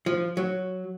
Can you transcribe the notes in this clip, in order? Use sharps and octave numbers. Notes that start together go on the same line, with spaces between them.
F3
F#3